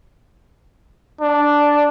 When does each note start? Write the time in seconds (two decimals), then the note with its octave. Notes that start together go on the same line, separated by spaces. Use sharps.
1.21 D4